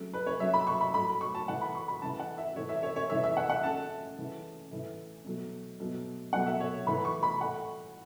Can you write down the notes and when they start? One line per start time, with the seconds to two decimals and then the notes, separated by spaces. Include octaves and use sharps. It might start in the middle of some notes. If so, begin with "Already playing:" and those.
Already playing: C#3 F#3 A3
0.14 B4
0.26 C#5
0.40 C#3 F#3 A3 E5
0.54 B5
0.67 C#6
0.81 B5
0.94 A2 F#3 A3 B5
1.21 C#6
1.34 A5
1.48 A2 E3 A3 F#5
1.61 B5
1.75 C#6
1.88 B5
2.02 C#3 E3 A3 A5
2.19 F#5
2.38 E5
2.56 A2 E3 A3 C#5
2.69 E5
2.83 C#5
2.96 C#5
3.10 C#3 E3 A3 E5
3.24 E5
3.37 F#5
3.49 F#5
3.63 C#3 A3 A5
4.18 C#3 E3 A3
4.71 A2 E3 A3
5.25 B2 F#3 A3
5.79 B2 F#3 A3
6.33 B2 F#3 A3 F#5
6.46 E5
6.60 C#5
6.87 A2 E3 A3 B5
7.05 C#6
7.23 B5
7.41 A2 A3 F#5